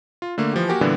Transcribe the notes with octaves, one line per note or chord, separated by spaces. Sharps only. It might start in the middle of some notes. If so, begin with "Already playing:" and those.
F4
D3 A3 A#3
E3 F3 G4
A#3 F#4 G4 A#4 G#5
A#2 D3 E3 G3 B3 D4